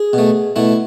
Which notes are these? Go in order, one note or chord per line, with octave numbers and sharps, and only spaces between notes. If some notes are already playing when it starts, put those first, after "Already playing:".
Already playing: G#4
B2 A3
B2 A3 E4